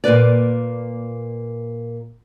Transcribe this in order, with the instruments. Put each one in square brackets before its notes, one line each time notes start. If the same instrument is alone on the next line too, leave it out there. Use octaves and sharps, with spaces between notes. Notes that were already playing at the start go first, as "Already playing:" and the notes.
[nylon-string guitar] A#2 A#3 B4 D5